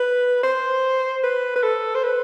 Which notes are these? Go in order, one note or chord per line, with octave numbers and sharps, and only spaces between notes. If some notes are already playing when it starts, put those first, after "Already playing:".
Already playing: B4
C5
B4
B4
A4
C5
B4